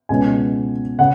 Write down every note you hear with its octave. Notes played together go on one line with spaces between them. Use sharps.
C#2 B2 G#3 C#4 G#5
C#3 F#5